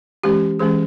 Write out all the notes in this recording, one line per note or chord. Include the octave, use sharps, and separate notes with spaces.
E3 G#3 C#4 G4
E3 G#3 C#4 G#4